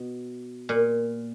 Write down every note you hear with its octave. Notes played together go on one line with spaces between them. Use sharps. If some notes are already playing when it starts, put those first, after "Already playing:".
Already playing: B2
A#2